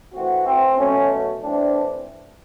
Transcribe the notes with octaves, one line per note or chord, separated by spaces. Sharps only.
E3 A3 C4 F#4
C4
B2 F#3 A3 C#4
E3 A3 C4 D4